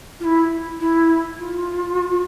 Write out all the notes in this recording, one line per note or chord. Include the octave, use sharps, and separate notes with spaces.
F4
E4
E4
F4